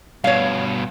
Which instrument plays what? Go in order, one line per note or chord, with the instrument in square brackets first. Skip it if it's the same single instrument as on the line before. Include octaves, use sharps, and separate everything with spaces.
[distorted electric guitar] G2 B2 [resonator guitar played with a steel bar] C#5 F5